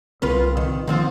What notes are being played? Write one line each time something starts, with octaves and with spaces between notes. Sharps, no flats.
C2 C#3 C4 F4 A#4 B4
D#3
D#3 F3 C4 F4